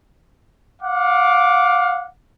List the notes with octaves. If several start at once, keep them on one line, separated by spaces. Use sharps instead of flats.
F5 F#5 D6